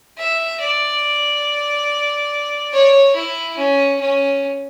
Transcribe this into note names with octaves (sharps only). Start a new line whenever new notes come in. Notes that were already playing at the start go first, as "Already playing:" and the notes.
E5
D5
C#5
E4
C#4
C#4